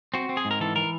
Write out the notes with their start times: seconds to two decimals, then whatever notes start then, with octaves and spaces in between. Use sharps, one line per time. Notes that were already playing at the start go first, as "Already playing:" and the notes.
0.14 C4 F#4
0.29 C4
0.37 G#4
0.45 G#2
0.51 A#4
0.60 E3 A4
0.76 E3 A#4